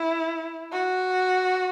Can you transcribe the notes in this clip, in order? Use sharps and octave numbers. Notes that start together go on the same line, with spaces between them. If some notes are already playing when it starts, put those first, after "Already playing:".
Already playing: E4
F#4